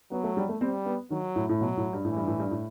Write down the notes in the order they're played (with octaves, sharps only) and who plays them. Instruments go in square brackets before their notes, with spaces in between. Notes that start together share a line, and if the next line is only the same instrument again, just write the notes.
[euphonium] F#3 [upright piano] B3
[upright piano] A3
G3
A3
[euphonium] G3 [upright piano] C4
[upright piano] B3
[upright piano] D#3 [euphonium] F#3
[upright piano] A2
A2
[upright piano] B2 [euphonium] F#3
[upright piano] A2
G2
A2
[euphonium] E3
[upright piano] G2
A2
G2
A2